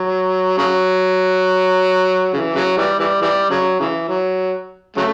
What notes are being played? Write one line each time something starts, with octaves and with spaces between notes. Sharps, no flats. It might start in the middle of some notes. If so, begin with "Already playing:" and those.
Already playing: F#3
C#3 F#3
C#3 E3
C#3 F#3
E3 G3
E3 G3
E3 G3
C#3 F#3
C#3 E3
F#3
C#3 F#3 A3